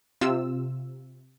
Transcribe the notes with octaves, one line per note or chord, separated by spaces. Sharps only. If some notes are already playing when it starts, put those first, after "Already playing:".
C3 F4 E6